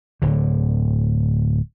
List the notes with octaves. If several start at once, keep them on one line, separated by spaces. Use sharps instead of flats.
D1 D3